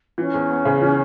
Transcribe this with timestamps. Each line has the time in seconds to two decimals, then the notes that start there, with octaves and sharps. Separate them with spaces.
0.18 E3 C#4
0.34 E2
0.50 B3
0.65 C#3
0.81 E3